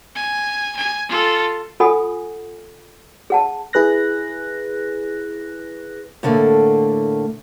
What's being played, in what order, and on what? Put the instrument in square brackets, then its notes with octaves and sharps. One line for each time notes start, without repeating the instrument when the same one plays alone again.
[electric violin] G#5
G#5
F4 A4
[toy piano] F4 A4 F#5 G#5 B5 D#6
G#4 F#5 A5
[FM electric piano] E4 G#4 B4 F#6 A#6
[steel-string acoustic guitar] A2 D3 A3 A#3